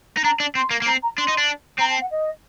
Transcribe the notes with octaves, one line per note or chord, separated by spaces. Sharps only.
D#4
D4 A#5
D4
C4 C6
A#3
A#3
C4 A#5
A#5
D4 C6
D#4
D4
C4 A#5
A5
F#5
D#5